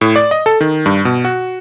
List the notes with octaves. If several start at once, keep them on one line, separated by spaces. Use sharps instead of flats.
A2
D5
D#5
A4
D#3
G2
B2
F#4